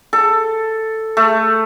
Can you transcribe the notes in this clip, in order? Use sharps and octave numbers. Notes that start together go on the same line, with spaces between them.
A4
A3